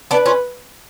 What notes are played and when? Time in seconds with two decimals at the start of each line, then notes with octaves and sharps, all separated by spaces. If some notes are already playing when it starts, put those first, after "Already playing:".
0.11 B3 D4 B4
0.26 C#4 F4